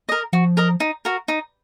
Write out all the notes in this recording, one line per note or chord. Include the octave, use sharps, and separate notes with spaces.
A#4 D#5
F3 F#4
A#4 D#5
D#4
F#4 A#4
D#4